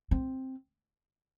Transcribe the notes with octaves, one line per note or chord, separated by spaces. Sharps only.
C4